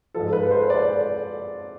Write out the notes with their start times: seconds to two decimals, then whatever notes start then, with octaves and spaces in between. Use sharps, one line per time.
0.14 G#2 F3 A4
0.33 B4
0.51 C5
0.70 D5